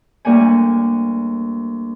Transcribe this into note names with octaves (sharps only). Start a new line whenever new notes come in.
D2 G3 A#3 F#5 G#5